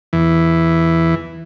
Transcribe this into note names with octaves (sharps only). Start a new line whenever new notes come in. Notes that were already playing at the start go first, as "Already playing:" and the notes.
E2 E3